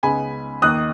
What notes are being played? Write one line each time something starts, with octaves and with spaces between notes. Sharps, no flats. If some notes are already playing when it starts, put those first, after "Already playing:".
C#2 C#3 G#3 B3 D#4 G#5 B5
D#2 D#3 A#3 D#4 D#6 F#6